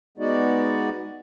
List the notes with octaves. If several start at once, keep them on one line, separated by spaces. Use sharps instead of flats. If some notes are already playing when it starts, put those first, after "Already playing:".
G#3 B3 D#4 F#4 D5